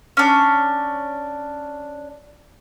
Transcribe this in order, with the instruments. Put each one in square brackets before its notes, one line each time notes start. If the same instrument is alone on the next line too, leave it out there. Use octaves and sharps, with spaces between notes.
[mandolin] C#4 D4